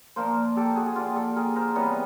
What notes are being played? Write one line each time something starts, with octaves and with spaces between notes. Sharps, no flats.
A#2 F3 A#3 A#4 C5
G4 A4
F#4 G#4
G#4
A#2 F3 A#3 F4 G4
G4 A4
G#4 A#4
A#4 C5
C3 E3 G3 B3 B4 C#5